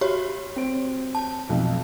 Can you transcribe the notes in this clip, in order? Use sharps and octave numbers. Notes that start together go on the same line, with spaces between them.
F#4 G4 C#5
C4 D7
A5
B1 F2